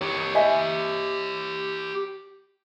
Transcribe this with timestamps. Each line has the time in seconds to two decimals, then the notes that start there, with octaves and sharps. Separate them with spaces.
0.01 G4 C#5
0.35 D#5 E5 G#5